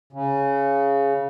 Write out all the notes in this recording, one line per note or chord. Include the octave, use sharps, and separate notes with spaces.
C#3